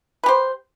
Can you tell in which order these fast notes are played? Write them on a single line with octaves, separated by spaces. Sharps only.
B4 G4 C5